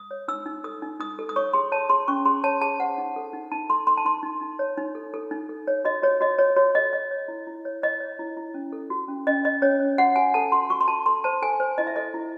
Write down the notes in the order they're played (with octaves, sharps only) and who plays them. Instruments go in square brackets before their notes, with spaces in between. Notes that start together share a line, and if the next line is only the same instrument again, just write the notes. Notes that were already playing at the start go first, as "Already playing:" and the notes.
Already playing: [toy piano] D#6
C#5
D#4 E6
D#4
A4 D#6
D#4
D#4 D#6
A4
D#6
C#5 C#6
G#4 C6
C#5 A5
G#4 C6
C#4 C#6
G#4 C6
C#5 A5
G#4 A5
C5 F#5
D#4
A4
D#4
D#4 A5
A4 C6
A4 C6
A5
D#4 C6
D#4
D#4
C#5
D#4
A4
A4
D#4
A4
C#5
F#4 D#5
F#4 C#5
F#4 D#5
F#4 C#5
F#4 C#5
A4 D#5
C#5 D#5
C#5
E4
E4
C#5
C#5 D#5
C#5
E4
E4
C#4
A4
F#4
C#4
C#4 D#5
C#4 D#5
C#4 C#5
C#4
F#4 F#5
F#4 G#5
A4 A5
F#4 C6
F#4 C#6
C6
F#4 A5
A4 C6
C5 A5
A4 G#5
C5
E4 D#5
E5
A4 D#5
E4